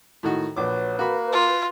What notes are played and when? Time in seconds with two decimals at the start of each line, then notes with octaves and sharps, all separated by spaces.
0.23 A2 D#3 F#4
0.56 A#1 F#3 B4 D6
0.99 A#3 F#4 B5
1.33 F4